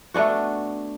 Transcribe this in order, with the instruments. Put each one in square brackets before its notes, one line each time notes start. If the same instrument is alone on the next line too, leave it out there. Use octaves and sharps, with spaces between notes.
[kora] A3 B3 D4 F#4